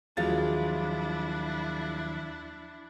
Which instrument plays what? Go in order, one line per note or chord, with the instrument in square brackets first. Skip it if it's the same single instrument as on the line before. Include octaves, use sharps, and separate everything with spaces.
[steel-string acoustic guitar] D#2 F3 F#3 [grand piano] G#3 F4 A6 [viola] D4 E4